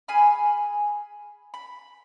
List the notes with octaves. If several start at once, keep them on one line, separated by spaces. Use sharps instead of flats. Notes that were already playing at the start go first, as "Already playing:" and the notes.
G#4 G#5 B5 F6
B5